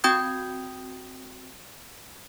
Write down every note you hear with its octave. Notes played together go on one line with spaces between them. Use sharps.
C4 F#4 G5 D#6 G6 G#6